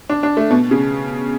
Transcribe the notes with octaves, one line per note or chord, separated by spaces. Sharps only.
D4
D4
A3
B2
C#3